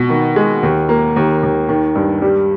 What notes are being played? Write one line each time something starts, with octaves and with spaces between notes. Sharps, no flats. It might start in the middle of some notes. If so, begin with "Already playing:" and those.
Already playing: B2
D#3
G#3
D#2
A#3
D#2
D#2
D#3
G2
G3